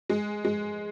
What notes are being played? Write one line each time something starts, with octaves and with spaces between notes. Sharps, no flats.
G#3
G#3